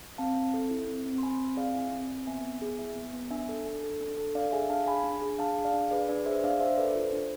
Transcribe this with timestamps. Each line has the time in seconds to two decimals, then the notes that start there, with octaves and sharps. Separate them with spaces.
0.18 C4 F5 A5
0.36 C4
0.54 A4
0.71 E4
0.88 C4
1.06 C4
1.18 C6
1.23 C4 G#5 B5
1.40 C4
1.57 G#4 D5 F5
1.75 E4 E5 G#5
1.92 C4
2.09 C4
2.27 B3 E5 G#5
2.43 B3
2.62 G#4
2.78 E4 E5 G#5
2.96 B3
3.13 B3
3.30 D4 E5 G#5
3.49 A4
3.65 D4
3.84 A4
4.01 D4
4.17 A4
4.35 D4 D5 F5
4.52 G#4 E5 G#5
4.70 D4 F5 A5
4.87 G#4 G#5 B5
5.04 D4
5.22 G#4
5.39 D4 F5 A5
5.56 G#4
5.65 D5 F5
5.74 D4
5.91 G#4 B4 D5
6.08 D4 B4 D5
6.26 G#4 C5 E5
6.43 D4 D5 F5
6.60 D4 C5 E5
6.78 A4 B4 D5
6.88 D5
6.95 F4 C5
7.12 D4